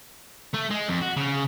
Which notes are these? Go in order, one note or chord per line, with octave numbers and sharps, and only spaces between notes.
A3
G#3
F2
F#4
C#3